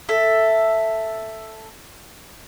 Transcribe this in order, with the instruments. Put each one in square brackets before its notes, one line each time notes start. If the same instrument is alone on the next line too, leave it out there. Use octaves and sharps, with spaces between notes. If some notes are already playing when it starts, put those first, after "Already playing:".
[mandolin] A4 E5